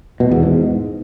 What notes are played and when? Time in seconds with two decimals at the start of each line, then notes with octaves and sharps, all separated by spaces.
0.20 B2
0.31 E2
0.43 G#2